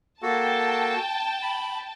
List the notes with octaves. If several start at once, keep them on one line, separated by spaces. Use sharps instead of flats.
A#3 F#4 A4 G5 A5
B5